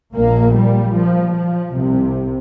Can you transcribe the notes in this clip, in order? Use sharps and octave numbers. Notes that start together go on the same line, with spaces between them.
A#1 A#2 A#3
G3
F3
F3
C2 C3